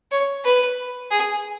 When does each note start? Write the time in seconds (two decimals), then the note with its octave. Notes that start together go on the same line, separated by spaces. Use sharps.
0.11 C#5
0.44 B4
1.11 G#4